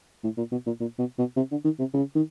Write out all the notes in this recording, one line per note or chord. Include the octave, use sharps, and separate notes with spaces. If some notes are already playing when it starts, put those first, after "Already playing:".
A2
A#2
B2
A#2
A#2
B2
B2
C3
D3
D#3
C3
C#3
D#3